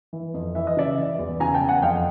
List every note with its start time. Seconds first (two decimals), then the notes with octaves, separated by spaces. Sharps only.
0.13 E3
0.34 F2
0.55 E3 E5
0.67 D#5
0.77 C#3 D5 E5
0.98 E3
1.19 E2
1.40 C#3 G#5 A#5
1.54 G5 A5
1.61 E2
1.69 F#5 G#5
1.82 F2 F5 G5